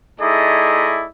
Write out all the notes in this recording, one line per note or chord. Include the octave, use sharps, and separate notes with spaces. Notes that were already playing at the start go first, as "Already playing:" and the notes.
A3 D#4 E4 G#4 D5 D#5